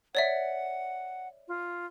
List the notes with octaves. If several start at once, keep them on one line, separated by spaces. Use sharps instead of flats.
C#5 D5 E5 F#5
F4